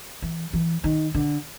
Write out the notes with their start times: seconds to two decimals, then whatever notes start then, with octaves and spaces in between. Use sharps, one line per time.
0.22 E3
0.53 E3
0.84 D#3
1.14 D3